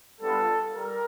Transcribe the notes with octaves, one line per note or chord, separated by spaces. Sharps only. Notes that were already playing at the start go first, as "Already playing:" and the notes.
G3 B3 D4 F4 A4
G3 A#4